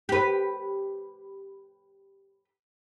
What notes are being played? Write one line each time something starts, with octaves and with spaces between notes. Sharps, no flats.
G4 B4